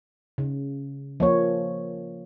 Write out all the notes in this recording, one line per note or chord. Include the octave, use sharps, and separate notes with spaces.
C#3
F3 A#3 C#5